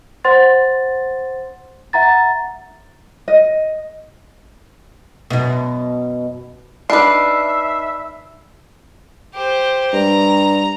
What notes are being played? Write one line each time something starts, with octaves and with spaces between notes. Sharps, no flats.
C5 F#5 C6 A6
E5 F#5 A#5 A6
D#5
F#2 B2
D4 D#4 B4 E5 B5 F6 C7
G4 C5
G2 A#5